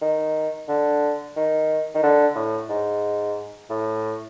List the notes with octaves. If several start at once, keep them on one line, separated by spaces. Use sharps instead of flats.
D#3
D3
D#3
D#3
D3
A2
G#2
A2